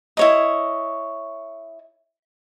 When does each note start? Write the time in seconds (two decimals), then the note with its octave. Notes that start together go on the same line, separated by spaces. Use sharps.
0.17 E4 C#5 D#5